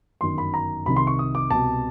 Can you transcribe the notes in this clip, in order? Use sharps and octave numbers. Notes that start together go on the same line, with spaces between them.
G1 F#2 D#3 C6
B5
A#5
C2 C3 D#3 B5
C6
C#6
D#6
D6
C2 B2 A5